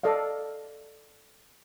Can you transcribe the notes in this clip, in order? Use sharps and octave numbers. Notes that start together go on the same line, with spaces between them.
A4 D5 D#5 F5